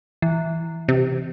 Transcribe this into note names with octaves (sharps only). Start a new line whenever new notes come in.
E3
C3